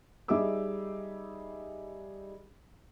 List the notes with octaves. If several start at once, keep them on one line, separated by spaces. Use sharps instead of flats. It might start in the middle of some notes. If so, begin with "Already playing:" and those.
G3 D#4 G#4 E5 D6 E6